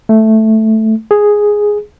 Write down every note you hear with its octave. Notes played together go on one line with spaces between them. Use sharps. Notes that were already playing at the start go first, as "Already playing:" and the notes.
A3
G#4